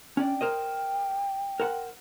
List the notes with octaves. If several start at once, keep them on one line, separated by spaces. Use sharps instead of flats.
C#4 D4 D5 G5
A#4 C5 D#5
A#4 C5 F#5